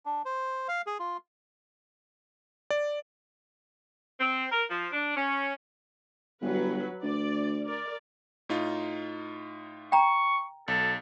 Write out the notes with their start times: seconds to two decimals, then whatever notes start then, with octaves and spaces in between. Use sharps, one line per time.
0.06 D4
0.25 C5
0.68 F5
0.87 G#4
0.99 F4
2.70 D5
4.19 C4
4.49 A#4
4.68 F3
4.91 D4
5.14 C#4
6.42 G1 F#3 B4
7.03 D2 D5
7.65 A#4 D5
8.49 A2 D#4 F4
9.92 G5 A#5 C#6
10.68 B1 A4